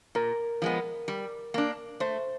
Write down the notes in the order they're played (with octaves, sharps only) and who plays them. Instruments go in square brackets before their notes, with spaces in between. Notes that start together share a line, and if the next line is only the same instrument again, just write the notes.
[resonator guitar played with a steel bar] A#2 [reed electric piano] A#4
[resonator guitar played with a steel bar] F3 G#3 B3
G3
A#3 D4
[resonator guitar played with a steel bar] A3 [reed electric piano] C5